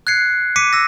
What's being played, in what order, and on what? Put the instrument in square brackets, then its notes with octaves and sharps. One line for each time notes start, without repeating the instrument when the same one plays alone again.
[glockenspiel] F#6 G#6 C7 C#7
D6 B6 C#7 D#7
E6 A#6